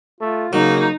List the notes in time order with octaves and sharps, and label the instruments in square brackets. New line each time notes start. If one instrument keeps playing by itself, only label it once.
[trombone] A3 [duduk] F4
[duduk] C#3 [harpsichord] F#3 [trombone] A#3 [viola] D#4